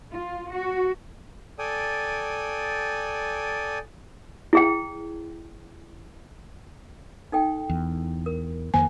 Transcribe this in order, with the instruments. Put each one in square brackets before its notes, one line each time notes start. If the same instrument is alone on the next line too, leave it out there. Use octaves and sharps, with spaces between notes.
[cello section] F4
F#4
[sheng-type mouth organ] A4 D5 G5 G#5 D#6
[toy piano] E4 G#4 G5
D#4 A4 G5
[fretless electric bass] E2
[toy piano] A#4
[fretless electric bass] F2 D#3 A#3 [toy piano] C5 [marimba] G#5